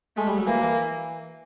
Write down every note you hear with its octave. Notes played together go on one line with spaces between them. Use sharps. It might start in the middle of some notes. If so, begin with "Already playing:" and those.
G#3 A3
G3
F#3
E3 A#3
E3